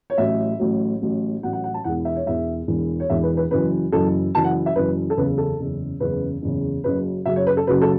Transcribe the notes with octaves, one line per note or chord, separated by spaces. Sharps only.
C#5
A1 A2 F#3 E5
A1 A2 F#3
A1 A2 F#3
A1 A2 F#3 F#5
F#5
F#5
A5
E1 E2 E3 F#5
E5
C#5
E1 E2 E3 E5
E1 E2 E3
C#5
E1 E2 E3 E5
B4
B4
F#1 F#2 E3 B4
F#1 F#2 E3 A4
F#1 F#2 E3 A5
F#5
E5
F#1 F#2 E3 B4
A4
F#1 E2 C#3 B4
A4
F#1 E2 C#3
F#1 E2 C#3 B4
F#1 E2 C#3
F#1 F#2 C#3 F#3 B4
F#1 F#2 C#3 F#3 E5
C#5
B4
A4
F#1 F#2 C#3 F#3 B4
A4